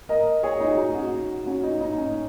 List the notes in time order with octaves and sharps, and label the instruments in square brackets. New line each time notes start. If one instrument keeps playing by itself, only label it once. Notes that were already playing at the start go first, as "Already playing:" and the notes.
[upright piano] A#4 D#5
G#4 C#5
D#4
F#4
D#4
C#4 F#4
C#4 F#4
D#4
D#4
C#4